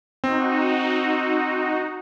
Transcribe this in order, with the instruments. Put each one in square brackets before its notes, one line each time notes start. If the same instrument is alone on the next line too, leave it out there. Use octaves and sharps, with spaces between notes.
[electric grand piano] C4 [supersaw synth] D#4 F#4